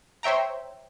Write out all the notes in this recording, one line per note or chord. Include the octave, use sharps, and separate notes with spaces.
C5 C#5 E5 G5 A#5